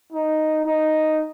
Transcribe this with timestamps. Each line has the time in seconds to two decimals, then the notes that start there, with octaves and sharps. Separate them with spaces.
0.13 D#4
0.65 D#4